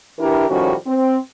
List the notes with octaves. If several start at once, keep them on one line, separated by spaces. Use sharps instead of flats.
E3 D4 E4 G4 A#4
A2 D#3 F3 G3 C#4 F#4
C4